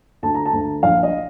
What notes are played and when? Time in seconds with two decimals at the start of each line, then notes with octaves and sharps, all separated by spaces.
0.23 D2 A5
0.34 A#5
0.45 A5
0.53 D2
0.83 A#1 F5
1.03 D#5